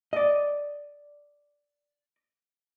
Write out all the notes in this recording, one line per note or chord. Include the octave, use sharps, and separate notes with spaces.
D5 D#5